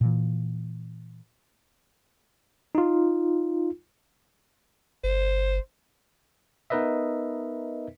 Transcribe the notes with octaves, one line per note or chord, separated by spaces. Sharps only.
A#2 E3
D#4 F4
G1 C5
B3 D#4 A#4 B4 D#5 E5